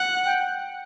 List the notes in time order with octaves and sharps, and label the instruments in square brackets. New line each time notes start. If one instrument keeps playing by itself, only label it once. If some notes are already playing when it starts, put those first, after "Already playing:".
Already playing: [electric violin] F#5
[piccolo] G5